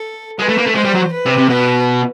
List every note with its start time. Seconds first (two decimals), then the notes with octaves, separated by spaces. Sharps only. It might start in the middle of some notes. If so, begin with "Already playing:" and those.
Already playing: A4
0.39 G#3 B4
0.49 A3
0.58 A#3
0.67 A3
0.75 G#3 C5
0.85 G3
0.94 F#3
1.13 B4
1.26 C3
1.38 C3
1.49 B2 B4